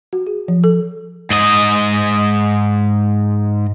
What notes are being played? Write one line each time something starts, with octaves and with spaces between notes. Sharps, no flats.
F#4
G#4
F3
A4
G#2 D#5